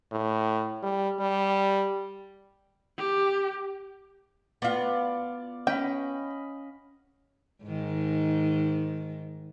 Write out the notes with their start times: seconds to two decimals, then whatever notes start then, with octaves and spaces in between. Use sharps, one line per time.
0.12 A2
0.83 G3
1.20 G3
2.98 G4
4.62 B3 F4 D5 F5 F#5
5.67 C#4 D#5 G5 B5
7.64 G#2 D#3